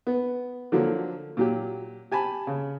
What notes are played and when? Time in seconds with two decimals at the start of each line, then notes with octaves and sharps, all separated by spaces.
0.07 B3
0.72 D3 F3 F#3 A#3
1.37 A#2 F#3 G4
2.12 G4 G#5 A5 B5
2.47 C#3